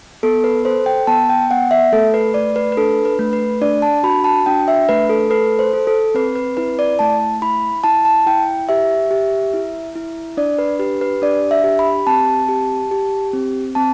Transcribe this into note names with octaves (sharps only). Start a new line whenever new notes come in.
B3 A4
B4
A4 C5
G5
B3 A5
G5
B3 F#5
E5
A3 A4
B4
A3 D5
B4
B4
D4 A4
B4
A3
B4
D4 D5
A5
F#4 B5
A5
D4 G5
E5
A3 B4
A4
A4 B4
C5
A4
A4
C4 B4
B4
E4 B4
D5
A3 A5
E4 B5
E4 A5
A5
E4 G5
G4 E5
G4
E4
E4
D4 D5
B4
G4 B4
B4
D4 D5
E5
G4
B5
C4 A5
G4
G4
C4
C4 A5